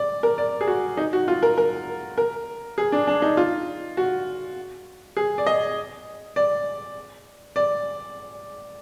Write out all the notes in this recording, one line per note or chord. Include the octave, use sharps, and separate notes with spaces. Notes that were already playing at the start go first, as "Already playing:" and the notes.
Already playing: D5
A#4
D5
G#4
F#4
D#4
F#4
F4
A#4
A#4
A#4
G#4
D4
D4
D#4
F4
F#4
G#4
D5
D#5
D5
D5